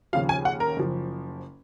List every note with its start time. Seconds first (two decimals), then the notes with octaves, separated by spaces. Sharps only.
0.13 D#2 C#3 F3 F5
0.29 G#5
0.45 F#5
0.60 A#4
0.77 F#1 F3